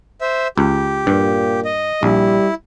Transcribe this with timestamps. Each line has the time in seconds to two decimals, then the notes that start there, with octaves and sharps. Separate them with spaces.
0.21 C5 E5
0.58 C#2 G4
1.07 G2 A#2
1.65 D#5
2.03 A#1 G3 E4